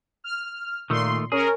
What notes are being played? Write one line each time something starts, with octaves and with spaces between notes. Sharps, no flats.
F6
A#2 D#3 A3 C6
C#4 G#4 A#4